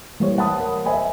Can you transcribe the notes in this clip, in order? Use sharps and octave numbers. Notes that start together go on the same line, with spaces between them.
E3 G3 A#3 G4 C5 C#5
F#5 A5 B5 D#6
A#4
C5 D#5 E5 G#5 B5